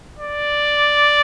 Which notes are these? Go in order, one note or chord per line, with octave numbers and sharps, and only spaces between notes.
D5